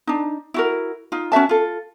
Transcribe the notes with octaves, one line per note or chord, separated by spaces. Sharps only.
D4 D#4
E4 F#4 A#4
D#4 F4
C#4 F#4 E5 A5
F4 A4